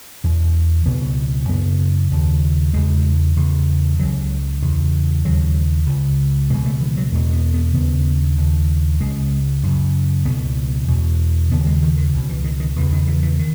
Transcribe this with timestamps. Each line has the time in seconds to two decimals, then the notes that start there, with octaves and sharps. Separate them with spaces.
0.24 E2 B2
0.86 C#2 B2 B3
1.49 F#2 C#3 B3
2.11 D#2 C#3
2.74 E2 C#3 G#3
3.37 E2 C#3
3.99 C#2 C#3 F#3
4.62 E2 C#3
5.24 D#2 C#3 F#3
5.87 C#2 C#3
6.50 C#2 B2 G#3
6.65 A3
6.81 E3
6.97 F#3
7.12 E2 A3
7.15 B2
7.33 B3
7.54 B3
7.74 D#2 C#3 B3
8.38 D#2 C#3
9.00 C#2 C#3 G#3
9.63 F#2 C#3
10.25 C#2 B2 B3
10.88 E2 B2
11.51 D#2 C#3 B3
11.67 G#3
11.83 D#3
11.97 D#3
12.14 C#2 B2
12.29 E3
12.44 D#3
12.60 D#3
12.76 E2 E3
12.81 C#3
12.92 D#3
13.07 E3
13.23 E3
13.39 D#3